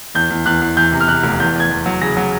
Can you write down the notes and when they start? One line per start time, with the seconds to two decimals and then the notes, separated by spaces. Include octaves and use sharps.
0.15 E2 G6
0.30 E2
0.46 E2 F#6
0.61 E2
0.77 E2 G6
0.93 C3
1.01 F6
1.08 C3 F#6
1.24 F1
1.40 E2 G6
1.55 E2 G#6
1.71 E2
1.86 F#3
2.01 C#3 A#6
2.17 F#3